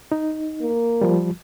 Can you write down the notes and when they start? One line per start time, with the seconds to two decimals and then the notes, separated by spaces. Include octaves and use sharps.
0.12 D#4
0.61 A#3
1.01 F3 G3